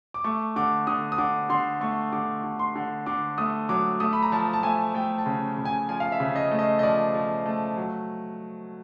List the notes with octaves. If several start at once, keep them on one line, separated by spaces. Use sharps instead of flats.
D6
A3 C#6
D3 D6
D3 D#6
D#6
D3 D6
D3 C6
A3 C#6
D3 D6
D3
C6
D3
D3 D6
A3 D#6
F#3 D6
A3 D#6
B5
A#5
F3 A5
A5
A3 G#5
A3 G5
A5
C#3
C#3
G#5
F3 G#5
F5
E5
C#3
D#5
A3
D#5
D#5
F3 D5
F3
A3
F#3